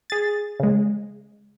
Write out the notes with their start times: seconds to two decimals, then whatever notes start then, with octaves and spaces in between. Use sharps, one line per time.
0.10 G#4 A6
0.60 C#3 G#3